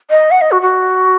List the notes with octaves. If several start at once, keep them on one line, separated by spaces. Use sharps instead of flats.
D#5
F#5
D#5
F#4
F#4